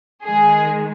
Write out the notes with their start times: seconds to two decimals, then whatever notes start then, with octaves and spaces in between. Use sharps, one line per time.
0.24 D#3 G#3 G#4